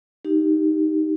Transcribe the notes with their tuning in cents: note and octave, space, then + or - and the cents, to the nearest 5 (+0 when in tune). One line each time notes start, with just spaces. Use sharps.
D#4 +0 G4 +0